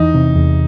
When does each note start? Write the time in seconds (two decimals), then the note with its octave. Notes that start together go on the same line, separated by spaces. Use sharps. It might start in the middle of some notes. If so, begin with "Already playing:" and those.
Already playing: E2 E3 D#4
0.15 C3
0.35 E2